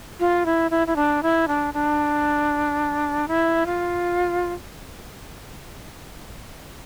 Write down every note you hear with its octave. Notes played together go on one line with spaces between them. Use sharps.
F4
E4
E4
E4
D4
E4
D4
D4
E4
F4